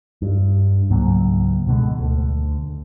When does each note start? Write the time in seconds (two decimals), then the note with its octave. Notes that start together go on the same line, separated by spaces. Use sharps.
0.22 G2
0.90 C#2 G#2 F#3 A#3
1.67 B2 D3 G#3
1.99 D2